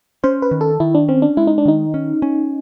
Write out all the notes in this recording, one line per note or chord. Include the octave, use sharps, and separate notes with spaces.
C#4 C5
B4
D#3
A4
D#3 E4
D4
C4 C#4
D4
G#3 E4
D#4
D4
D#3 D#4
C#4
C#4